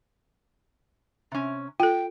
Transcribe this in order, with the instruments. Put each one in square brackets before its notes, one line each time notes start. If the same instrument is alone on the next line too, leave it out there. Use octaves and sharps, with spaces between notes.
[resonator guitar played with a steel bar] C3 C#4
[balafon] F4 A4 [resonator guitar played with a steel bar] G5